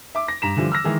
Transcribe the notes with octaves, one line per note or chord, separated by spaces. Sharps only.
E5 D6
A#6
G2 A#5 B6 E7
D3 E3 F3 G3
E6 F6 A#6
D#3 E3 G#3